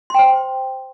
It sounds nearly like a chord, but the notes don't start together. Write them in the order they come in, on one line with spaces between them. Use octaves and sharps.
C6 G5 C5